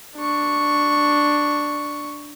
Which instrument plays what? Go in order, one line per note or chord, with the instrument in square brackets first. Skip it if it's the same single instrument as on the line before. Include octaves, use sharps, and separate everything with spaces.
[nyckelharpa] D4 C#6